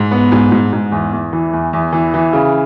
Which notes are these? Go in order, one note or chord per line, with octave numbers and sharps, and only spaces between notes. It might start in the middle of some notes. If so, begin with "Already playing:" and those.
Already playing: G#2
B3
G#2
G#2
G#2
E2
E2
E3
E2
E2
E3
E3
C#3